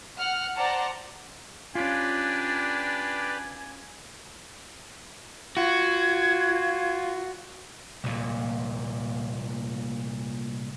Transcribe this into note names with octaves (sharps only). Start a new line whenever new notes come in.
F#5 F6
C5 D5 F#5 A5 A#5
C#4 D4 F4 G4 B4 D5 G#5
F4 F#4 G#6
C2 A#2